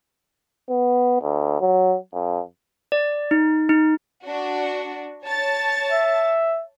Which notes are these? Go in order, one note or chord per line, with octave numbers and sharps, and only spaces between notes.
B3
D2
F#3
F2
D5
D#4
D#4
D4 F#4
C#5 A5 A6
E5